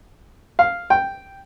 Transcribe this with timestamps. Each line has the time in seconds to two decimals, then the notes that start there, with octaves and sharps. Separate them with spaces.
0.59 F5
0.90 G5